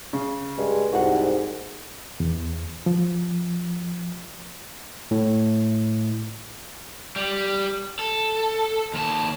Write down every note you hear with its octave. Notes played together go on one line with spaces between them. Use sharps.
C#3
G2 G#3
C2 G#2 F#4 F#5
E2
F3
A2
G3
A4
D#2 A5